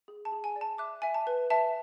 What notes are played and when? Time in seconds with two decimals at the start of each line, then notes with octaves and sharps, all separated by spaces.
0.08 G#4
0.25 A5
0.32 G#4
0.44 G#5
0.56 D5
0.61 A5
0.78 E5 D6 F#6
1.02 E5 G#5
1.14 A5
1.27 B4
1.50 E5 A5